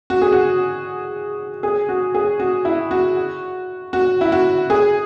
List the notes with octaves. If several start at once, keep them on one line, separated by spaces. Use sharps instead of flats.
F#4
G#4
F#4
G#4
F#4
G#4
F#4
E4
F#4
F#4
E4
F#4
G#4